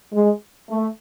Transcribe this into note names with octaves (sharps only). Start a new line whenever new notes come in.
G#3
A3